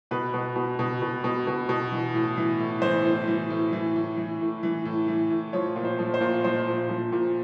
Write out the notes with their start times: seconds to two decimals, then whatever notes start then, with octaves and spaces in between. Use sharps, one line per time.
0.11 B2 B4
0.34 B2
0.56 B2
0.79 B2
1.02 B2
1.24 B2
1.47 B2
1.69 B2
1.92 E3
2.14 A2
2.37 E3
2.59 A2
2.82 E3 C5
3.05 A2
3.27 E3
3.50 A2
3.73 E3
3.96 A2
4.17 E3
4.41 A2
4.63 E3
4.85 A2
5.08 E3
5.30 A2
5.53 F3 C#5
5.76 A#2
5.84 C5
5.99 F3
6.14 C5
6.21 A#2
6.44 F3 C5
6.67 A#2
6.89 F3
7.12 A#2